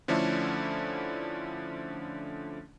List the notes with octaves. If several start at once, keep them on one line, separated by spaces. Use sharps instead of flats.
D3 F3 A3 C#4 D4 E4